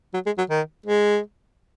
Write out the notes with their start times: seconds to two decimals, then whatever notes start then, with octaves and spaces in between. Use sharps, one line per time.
0.14 F#3
0.26 G#3
0.38 F#3
0.50 D#3
0.86 G#3